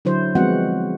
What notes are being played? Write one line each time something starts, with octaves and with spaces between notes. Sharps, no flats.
D3 F#3 E4 C5
F3 G#3 B3 C4 F#4 F#5